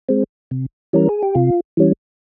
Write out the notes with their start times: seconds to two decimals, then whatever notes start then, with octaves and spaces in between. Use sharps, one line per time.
0.09 G#3 C4
0.51 C3
0.93 E3 G3 C#4 A#4
1.09 G#4
1.23 G4
1.35 C3 F4
1.77 E3 G3 C#4